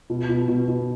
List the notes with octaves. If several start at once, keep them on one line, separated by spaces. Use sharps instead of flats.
B2
B2
B2
B2